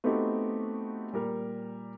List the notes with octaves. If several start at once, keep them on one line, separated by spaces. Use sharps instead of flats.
A3 B3 C4 D#4 F#4 G4
A#2 G3 A#4